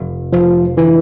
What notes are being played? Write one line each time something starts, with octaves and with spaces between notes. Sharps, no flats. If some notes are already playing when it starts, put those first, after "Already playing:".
Already playing: F1 F2
F1 F3
D3 E3